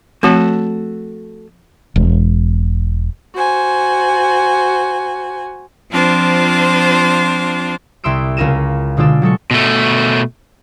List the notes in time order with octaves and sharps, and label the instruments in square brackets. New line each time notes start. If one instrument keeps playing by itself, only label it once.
[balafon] F3 C4 [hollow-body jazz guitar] A3 F#4 A4
[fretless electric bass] E1
[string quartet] F#4 C5 G#5
F3 C4 D4 F4 C5
[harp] C2 E4 C6 E6 D7
C#2 C#4 F4 A#4 D#7 E7
B2 D3 G#3 F4 D5 E6
F#3 G#3 A4 C#6
[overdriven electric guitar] B2 A3